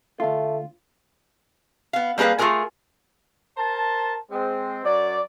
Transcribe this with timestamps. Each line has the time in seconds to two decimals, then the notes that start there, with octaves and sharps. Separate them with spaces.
0.20 D2 A3 F4
1.93 B3 F5
2.18 G3 A#3 G#4 B4 F5
2.38 A3 F4 G#4 A#4 G#5
3.57 A#4 C5 A5
4.31 G#3 C4
4.85 F#2 F#3 D5